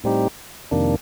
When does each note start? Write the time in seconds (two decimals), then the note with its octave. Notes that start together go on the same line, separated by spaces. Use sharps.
0.04 A2 G3 C4 D#4 G4
0.71 F2 C3 D#3 A#3 D4